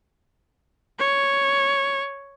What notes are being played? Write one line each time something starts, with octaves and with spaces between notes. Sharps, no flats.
C#5